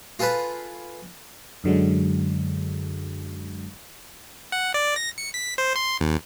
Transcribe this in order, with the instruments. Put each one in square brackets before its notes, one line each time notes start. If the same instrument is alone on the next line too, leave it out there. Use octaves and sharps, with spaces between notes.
[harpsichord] F4 G#4 A4 B4 B5
[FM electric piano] F#2 D3 F#3 G#3
[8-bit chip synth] F#5
D5
A#6
C#7
B6
C5
C6
D#2